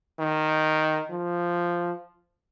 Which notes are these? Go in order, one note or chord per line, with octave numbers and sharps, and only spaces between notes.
D#3
F3